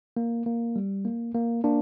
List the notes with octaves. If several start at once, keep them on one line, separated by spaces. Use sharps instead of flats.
A#3
A#3
G3
A#3
A#3
A#3 D4